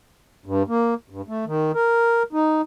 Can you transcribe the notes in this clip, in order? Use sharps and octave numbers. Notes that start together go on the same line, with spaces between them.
G2
A#3
G2
A3
D#3
A#4
D#4